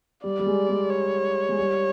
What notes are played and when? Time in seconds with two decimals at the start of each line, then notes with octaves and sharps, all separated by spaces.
0.24 G3 D5
0.39 G3
0.46 G#3
0.69 G#3
0.91 C#5
1.49 G#3
1.58 G3